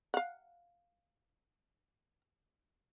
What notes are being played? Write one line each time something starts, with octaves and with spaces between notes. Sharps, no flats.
F5 F#5